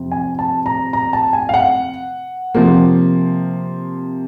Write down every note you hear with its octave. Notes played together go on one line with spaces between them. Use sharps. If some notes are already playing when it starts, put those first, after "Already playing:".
Already playing: F2 C3 F3 C4
G#5
A5
A#5
A#5
A5
G#5
F5
F#5
C3 F3 A#3